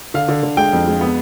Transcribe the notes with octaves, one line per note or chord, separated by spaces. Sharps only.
D3 F5
D3
D3
G#3 G5
F2
G#3
B3